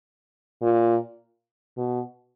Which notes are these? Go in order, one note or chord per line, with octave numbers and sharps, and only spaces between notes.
A#2
B2